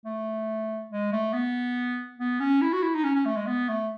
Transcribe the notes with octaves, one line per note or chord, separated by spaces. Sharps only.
A3
G#3
A3
B3
B3
C#4
E4
F#4
E4
D#4
C#4
C#4
A3
G#3
B3
A3